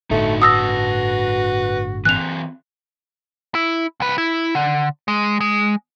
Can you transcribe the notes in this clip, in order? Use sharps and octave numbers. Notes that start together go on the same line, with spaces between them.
G1 A2 D3 A3 D#4 F#4
F#4 B4 A5 D#6 E6 A#6
E3 C4 F#6 F7
E4
C2 B4
E4
D3
G#3
G#3